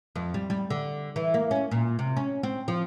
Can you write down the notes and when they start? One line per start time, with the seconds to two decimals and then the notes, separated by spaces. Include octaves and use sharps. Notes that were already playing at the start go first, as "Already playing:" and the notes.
0.16 F2
0.34 G3
0.50 G3
0.70 D3
1.16 E3
1.34 A#3
1.51 C#4
1.71 A#2
1.99 C3
2.17 C#4
2.43 C4
2.68 F3